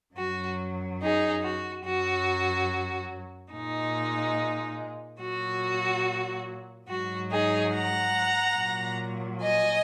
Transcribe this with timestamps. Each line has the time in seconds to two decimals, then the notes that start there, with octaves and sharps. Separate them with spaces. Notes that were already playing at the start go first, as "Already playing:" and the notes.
0.15 F#2 F#3 F#4
1.00 D#4 G#4
1.42 F#4
1.83 F#2 F#3 F#4
3.52 A#2 G#3 D#4
5.19 A#2 F#3 F#4
6.88 G#2 F#3 F#4
7.30 D#4 G#4
7.72 F#5 A#5
8.56 A#2 F#3
9.40 D#5 G#5